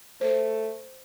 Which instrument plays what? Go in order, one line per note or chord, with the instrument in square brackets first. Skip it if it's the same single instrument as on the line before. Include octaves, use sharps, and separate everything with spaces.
[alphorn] A3 [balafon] C5